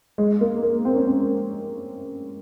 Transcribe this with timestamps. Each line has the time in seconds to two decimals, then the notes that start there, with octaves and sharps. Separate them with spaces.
0.18 G#3
0.41 A#3
0.63 A#3
0.85 C4
0.95 C#4
1.07 C4